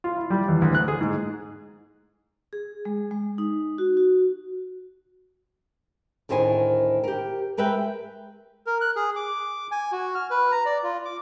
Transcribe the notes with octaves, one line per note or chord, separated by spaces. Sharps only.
F4
E4
G3
E2
D2
F#6
G#4
G#2
G#4
G#3
G#3
D#4
F#4
F#4
D2 A2 D#3 C5 G#5
G4 A#4
G#3 A#4 B4 E5 G5
A#4
F#6
G#4
D6
G#5
F#4
F6
B4
A#5
D5
F4
D6